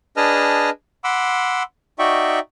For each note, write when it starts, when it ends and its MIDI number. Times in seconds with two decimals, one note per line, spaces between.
0.17 0.70 62
0.17 0.70 68
0.17 0.70 71
0.17 0.70 75
0.17 0.70 81
0.17 0.70 89
1.04 1.63 78
1.04 1.63 83
1.04 1.63 84
1.04 1.63 86
1.04 1.63 88
1.99 2.39 63
1.99 2.39 66
1.99 2.39 74
1.99 2.39 76
1.99 2.39 79
1.99 2.39 85